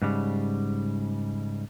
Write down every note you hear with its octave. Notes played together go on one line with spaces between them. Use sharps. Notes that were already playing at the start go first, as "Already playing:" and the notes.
G#2 C#3 G3